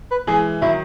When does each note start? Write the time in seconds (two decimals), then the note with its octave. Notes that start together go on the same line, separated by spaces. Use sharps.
0.11 B4
0.27 E3 G#3 G#4
0.61 D#3 F#3 E4